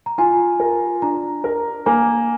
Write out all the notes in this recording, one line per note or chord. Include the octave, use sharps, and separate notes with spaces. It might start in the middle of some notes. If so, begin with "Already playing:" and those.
A#5
F4 G#5
A#4
D4 A#5
A#4
A#3 G#5